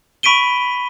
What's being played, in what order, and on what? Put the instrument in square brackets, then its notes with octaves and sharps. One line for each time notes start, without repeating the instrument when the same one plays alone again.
[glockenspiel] B5 C#6 B6 D7 D#7 G7